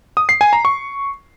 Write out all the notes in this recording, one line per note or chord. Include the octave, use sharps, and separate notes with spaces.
D#6
C7
G#5
A#5
C#6